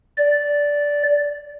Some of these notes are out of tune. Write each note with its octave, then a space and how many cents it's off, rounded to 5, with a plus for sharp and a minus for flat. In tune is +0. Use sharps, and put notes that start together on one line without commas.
D5 -10